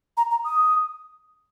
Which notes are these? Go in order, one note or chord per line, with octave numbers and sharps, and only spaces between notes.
A#5
A#5
D#6